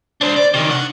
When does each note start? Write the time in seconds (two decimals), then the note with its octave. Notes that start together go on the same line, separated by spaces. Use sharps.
0.21 D4 C5
0.36 D5
0.54 C3 D#3
0.70 D4 F#5